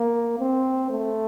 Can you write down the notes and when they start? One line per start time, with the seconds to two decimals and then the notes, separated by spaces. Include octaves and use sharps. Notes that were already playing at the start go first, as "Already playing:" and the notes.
Already playing: A#3
0.39 C4
0.90 A3